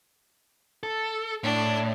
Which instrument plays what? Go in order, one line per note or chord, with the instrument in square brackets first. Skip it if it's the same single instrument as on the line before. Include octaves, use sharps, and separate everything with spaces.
[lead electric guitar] A4
[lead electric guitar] A2 [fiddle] D4